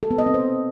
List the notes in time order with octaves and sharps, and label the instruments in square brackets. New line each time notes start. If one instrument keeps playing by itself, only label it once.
[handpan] A4
B3
D#5
C4
C5